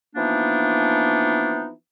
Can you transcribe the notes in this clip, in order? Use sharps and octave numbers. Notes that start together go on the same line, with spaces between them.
E3 F3 A#3 B3 D4 D#4